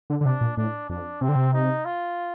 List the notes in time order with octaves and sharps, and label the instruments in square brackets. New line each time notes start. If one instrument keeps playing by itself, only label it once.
[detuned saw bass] D3
D3
[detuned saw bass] C3 [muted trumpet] D4
[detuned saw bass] A#2
[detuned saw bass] A2 [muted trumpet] D4
[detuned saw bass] F2 [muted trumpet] D4
[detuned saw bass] C3 [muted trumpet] C4
[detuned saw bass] D3
C3
[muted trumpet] D#4
F4